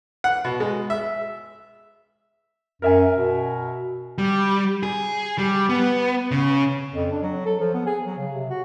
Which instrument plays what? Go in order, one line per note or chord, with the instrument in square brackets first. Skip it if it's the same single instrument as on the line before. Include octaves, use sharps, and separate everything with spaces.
[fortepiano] F#5
B2
G#3
E5
[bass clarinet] F#2 [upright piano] A#4 E5 G#5
[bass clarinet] B2
[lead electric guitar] G3
G#4
G3
B3
C#3
[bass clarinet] F2
D4
F#3
A4
F3
B3
G#4
F#3
C#3
C3
F#4